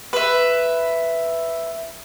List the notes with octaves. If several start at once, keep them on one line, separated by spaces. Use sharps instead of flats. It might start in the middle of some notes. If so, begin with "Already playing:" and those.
B4 E5